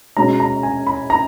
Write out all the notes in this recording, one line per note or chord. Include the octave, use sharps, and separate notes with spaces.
B2 G#3 C#4 A#5
A#5
G#5
B5
A#5